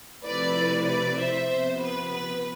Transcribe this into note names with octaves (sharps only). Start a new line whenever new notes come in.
C3 F3 A3 E4 B4 D5
B4 D5
C5 E5
C3 F3 B3 C5
B4
B4